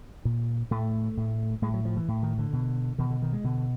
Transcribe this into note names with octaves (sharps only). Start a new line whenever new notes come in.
A#2
A2 A3
A2
A2 G#3
F#3
F3
E3
A2
D#3
D3
B2
B2 D#3
D3
D#3
G#3
B2 D3